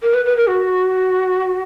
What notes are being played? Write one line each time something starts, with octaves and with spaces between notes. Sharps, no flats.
A#4
B4
B4
A#4
F#4